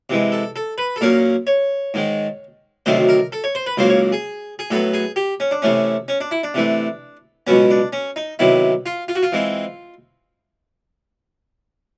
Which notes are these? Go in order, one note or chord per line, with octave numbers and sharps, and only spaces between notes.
C3 E3 G#3
A4
A4
B4
A4
A#2 F#3 A#3 C#4 A#4
C#5
G#2 D#3 G#3
D2 C3 D#3 F#3 A3 C5
A#4
A4
C#5
C5
B4
C#2 C#3 F#3 A#3 C5
C#5
G#4
G#4
A2 F#3 B3 A4
G#4
G4
C#4
D4
C3 E3 A3 C#4
C#4
D4
E4
D4
C3 E3 A3
C#2 B2 F#3 B3 C#4
D4
C#4
D#4
C3 D#3 F#3 B3 E4
F4
F4
F#4
F4
E3 G#3 C4